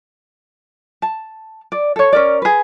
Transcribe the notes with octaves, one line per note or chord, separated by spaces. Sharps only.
A5
D5
A4 C#5
C#4 A#4 D5
G#4 B4